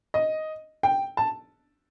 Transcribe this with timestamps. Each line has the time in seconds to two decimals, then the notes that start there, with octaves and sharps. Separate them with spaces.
0.14 D#5
0.83 G5
1.17 A5